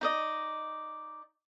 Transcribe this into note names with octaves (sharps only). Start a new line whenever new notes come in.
D#4 D5 D#5